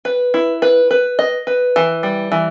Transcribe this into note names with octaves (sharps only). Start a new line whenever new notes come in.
B4
E4
B4
B4
D#5
B4
E3
G3
E3